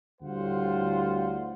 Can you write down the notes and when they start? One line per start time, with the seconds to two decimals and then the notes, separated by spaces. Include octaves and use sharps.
0.21 D2 A2 G3 F4 C5 F#5